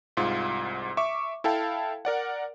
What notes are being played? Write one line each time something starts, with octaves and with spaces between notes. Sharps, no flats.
C2 G#2 F4
E5 C#6 D6
E4 A4 F5 G5 A5
A#4 D5 F#5